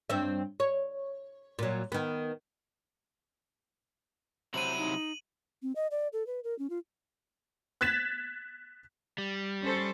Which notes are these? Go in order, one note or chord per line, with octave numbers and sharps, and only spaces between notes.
G2 C4 E5
C#5
A#2 F#3
D#3 B3
C3 F#3 E4 C5 D#7 F#7
D#4
C4
D#5
D5
A4
B4
A#4
C#4
F4
F#6 G#6 A6 B6 E7
G3
C#4 A4 C5